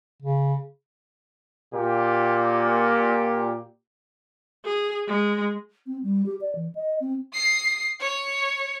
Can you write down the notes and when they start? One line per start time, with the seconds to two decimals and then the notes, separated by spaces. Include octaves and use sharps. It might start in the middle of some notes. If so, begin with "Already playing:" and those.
0.22 C#3
1.73 A#2 G4
4.65 G#4
5.07 G#3
5.87 C4
6.03 G3
6.26 G4
6.41 D5
6.55 E3
6.75 D#5
7.00 C4
7.34 D#6 C7
8.00 C#5 C#6